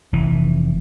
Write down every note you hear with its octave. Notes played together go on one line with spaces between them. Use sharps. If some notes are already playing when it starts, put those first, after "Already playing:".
F1 E3